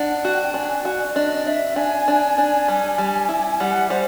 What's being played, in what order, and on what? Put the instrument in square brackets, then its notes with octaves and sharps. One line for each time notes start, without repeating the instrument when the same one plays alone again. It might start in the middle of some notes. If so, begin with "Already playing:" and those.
Already playing: [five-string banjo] D4 [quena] F#5
[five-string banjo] F#4 [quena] G5
[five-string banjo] D4 [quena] G#5
[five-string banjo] F#4 [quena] D5
[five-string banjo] D4 [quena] D#5
[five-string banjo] D4 [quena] E5
[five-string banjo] D4 [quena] G#5
[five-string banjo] D4
D4
G3
G3
E4
[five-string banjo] G3 [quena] F#5
[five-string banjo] G3 [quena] C5